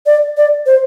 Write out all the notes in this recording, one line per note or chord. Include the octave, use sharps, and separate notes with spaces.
D5
D5
C5